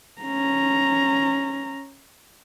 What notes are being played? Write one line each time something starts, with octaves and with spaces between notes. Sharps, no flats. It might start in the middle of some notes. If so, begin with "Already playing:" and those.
C#4 A#5